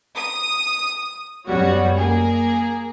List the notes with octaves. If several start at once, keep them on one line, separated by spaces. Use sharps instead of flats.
D#6
F#2 B2 G3 B3 F#4 C#5
A#3 G#4